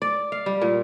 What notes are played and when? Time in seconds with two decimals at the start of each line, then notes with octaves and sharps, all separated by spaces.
0.02 D5
0.32 F5
0.46 G3
0.62 A#2